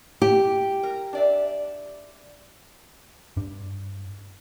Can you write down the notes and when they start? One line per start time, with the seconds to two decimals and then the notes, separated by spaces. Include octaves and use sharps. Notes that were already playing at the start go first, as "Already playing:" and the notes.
0.22 G4
0.83 A#4
1.13 D4 D5 E5
3.37 G2 D4